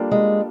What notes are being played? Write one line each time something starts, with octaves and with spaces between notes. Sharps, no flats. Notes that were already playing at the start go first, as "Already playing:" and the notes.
Already playing: G3 A#3 D4 F4 A4
G#3